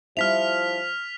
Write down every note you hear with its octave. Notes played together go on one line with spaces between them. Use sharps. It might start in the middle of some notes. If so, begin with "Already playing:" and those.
F3 G3 E4 E5 F6 B6 F7